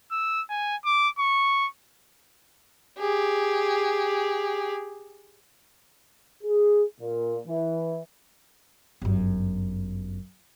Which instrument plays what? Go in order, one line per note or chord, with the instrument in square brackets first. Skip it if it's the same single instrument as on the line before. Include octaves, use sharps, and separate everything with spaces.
[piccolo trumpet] E6
G#5
D6
C#6
[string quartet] G4 G#4
[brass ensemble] G#4
A#2
E3
[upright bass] G1 F#2